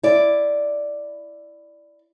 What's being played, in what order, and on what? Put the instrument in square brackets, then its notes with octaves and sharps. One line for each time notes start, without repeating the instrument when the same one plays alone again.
[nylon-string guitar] E4 D5